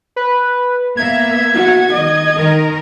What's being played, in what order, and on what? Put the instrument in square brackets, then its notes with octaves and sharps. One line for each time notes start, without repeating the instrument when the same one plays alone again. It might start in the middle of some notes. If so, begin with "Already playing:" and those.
[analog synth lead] B4
[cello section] A#3 B3 E5 [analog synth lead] G#6
[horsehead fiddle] F#4
[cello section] D#3 [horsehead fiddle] D#5
[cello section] D#3 A#4